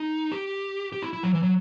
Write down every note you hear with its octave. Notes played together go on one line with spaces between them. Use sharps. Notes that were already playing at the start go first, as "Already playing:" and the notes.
Already playing: D#4
G4
G4
E4
E4
F#3
E3
F#3